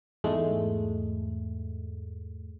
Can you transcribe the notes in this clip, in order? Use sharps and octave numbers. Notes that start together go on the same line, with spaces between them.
E2 G#2 G#3 A3